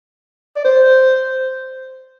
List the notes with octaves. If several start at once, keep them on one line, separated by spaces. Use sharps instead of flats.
D5
C5